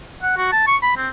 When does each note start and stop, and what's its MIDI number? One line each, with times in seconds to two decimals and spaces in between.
0.22 0.34 78
0.37 0.50 66
0.52 0.62 81
0.67 0.77 85
0.82 0.94 83
0.97 1.09 60